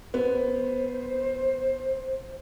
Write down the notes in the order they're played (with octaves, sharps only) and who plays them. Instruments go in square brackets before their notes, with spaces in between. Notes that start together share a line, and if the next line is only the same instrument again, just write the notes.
[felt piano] B3 [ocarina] C5